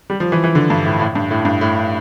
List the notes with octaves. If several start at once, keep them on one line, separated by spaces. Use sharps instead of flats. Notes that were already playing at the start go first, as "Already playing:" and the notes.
G3
F3
E3
E3
D3
G2
A2
A2
G2
A2
G2
A2